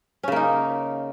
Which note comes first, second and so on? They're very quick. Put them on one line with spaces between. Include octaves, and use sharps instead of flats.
C#4 C#3 A#3 D#4